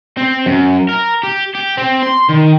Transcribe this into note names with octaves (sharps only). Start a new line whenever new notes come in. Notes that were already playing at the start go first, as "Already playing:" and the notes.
C4
F#2
A#4
G4
G4
C4
C6
D#3